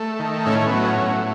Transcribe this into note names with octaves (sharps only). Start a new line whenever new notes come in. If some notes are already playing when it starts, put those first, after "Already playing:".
Already playing: A3
D#3
A2 C#4
B3
F#3
C#4
A2